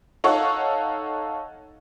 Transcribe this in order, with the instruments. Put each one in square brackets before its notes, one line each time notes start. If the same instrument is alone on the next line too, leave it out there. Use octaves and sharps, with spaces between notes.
[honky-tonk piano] D#4 A4 C#5 F5 F#5 C#6